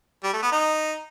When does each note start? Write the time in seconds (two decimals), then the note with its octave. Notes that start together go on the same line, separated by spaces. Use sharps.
0.24 G3
0.33 A3
0.42 B3
0.52 D#4